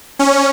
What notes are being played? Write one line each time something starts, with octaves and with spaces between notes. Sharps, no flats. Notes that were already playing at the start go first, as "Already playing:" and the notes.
C#4